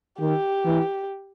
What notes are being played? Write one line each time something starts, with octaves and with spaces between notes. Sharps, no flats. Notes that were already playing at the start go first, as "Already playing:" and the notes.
D#3 G4
E3